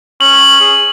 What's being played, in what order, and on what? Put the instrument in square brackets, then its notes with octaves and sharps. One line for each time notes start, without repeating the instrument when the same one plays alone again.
[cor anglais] C#4 [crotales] F#7
[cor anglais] G#4